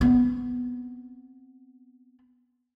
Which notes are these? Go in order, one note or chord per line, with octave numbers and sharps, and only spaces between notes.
B3 C4